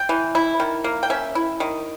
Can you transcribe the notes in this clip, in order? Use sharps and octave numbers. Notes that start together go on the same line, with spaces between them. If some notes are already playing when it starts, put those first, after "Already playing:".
Already playing: G5
E3
E4
D#3
A#3
G5
C#4 E5
E4
D#3